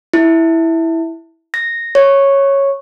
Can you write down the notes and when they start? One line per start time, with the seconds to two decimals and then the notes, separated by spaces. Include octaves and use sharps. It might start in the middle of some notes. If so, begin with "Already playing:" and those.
0.14 E4
1.54 A#6
1.95 C#5